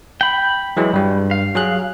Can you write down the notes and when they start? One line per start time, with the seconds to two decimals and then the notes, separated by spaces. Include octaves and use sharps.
0.21 G5 B5
0.77 E3 F#3 G#3
0.93 G2 G3
1.31 F5
1.55 F#3 G#4 F#6